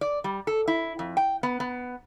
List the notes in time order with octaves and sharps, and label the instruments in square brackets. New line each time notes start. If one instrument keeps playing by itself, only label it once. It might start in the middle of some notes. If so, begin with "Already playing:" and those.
[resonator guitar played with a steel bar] D5
G3
A4
E4
F2
G5
B3
B3